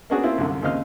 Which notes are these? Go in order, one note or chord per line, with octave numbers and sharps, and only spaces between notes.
A#3 B3 C#4 D4 F#4 G#4
A#3 C4 E4 F4
C2 F#2 D3
D#2 C#3 C4 D#5 F5 F6